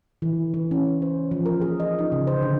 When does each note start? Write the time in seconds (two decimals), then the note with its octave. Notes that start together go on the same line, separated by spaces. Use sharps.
0.22 E3
0.54 E3
0.71 C#4
1.02 C5
1.31 F3
1.46 A#4
1.61 G#4
1.80 D#5
1.99 D#4
2.12 C#3
2.27 C5
2.42 D3